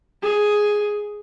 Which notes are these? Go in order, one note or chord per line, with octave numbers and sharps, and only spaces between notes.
G#4